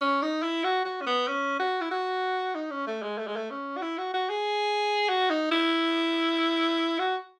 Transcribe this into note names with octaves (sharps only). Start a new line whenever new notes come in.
C#4
D#4
E4
F#4
F#4
C#4
B3
C#4
F#4
E4
F#4
D#4
C#4
A3
G#3
A3
G#3
A3
C#4
F#4
E4
F#4
F#4
G#4
F#4
D#4
E4
F#4